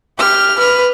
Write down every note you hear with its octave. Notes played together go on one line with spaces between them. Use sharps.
G4 F6
B4 F6